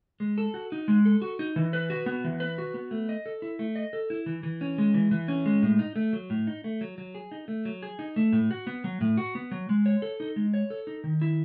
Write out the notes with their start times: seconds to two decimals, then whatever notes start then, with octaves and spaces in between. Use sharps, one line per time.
0.20 G#3
0.38 A4
0.54 F#4
0.72 D#4
0.88 G#3
1.05 A4
1.22 F#4
1.39 D#4
1.56 E3
1.73 B4
1.90 F#4
2.06 B3
2.24 E3
2.40 B4
2.58 F#4
2.74 B3
2.91 A3
3.09 D#5
3.26 A4
3.42 E4
3.59 A3
3.76 D#5
3.93 A4
4.10 E4
4.26 E3
4.43 E3
4.61 C#4
4.78 G#3
4.94 E3
5.11 E3
5.28 C#4
5.46 G#3
5.62 A2
5.79 D#4
5.96 A3
6.13 F#3
6.30 A2
6.47 D#4
6.64 A3
6.81 F#3
6.98 F#3
7.15 G#4
7.32 D#4
7.48 A3
7.65 F#3
7.83 G#4
7.99 D#4
8.16 A3
8.33 A2
8.51 F#4
8.67 B3
8.84 F#3
9.01 A2
9.17 F#4
9.35 B3
9.51 F#3
9.69 G#3
9.86 C#5
10.02 A4
10.20 D#4
10.36 G#3
10.54 C#5
10.70 A4
10.87 D#4
11.04 D#3
11.21 E4